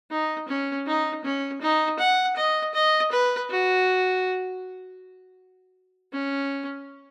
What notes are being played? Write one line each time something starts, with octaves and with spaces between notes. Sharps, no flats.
D#4
C#4
D#4
C#4
D#4
F#5
D#5
D#5
B4
F#4
C#4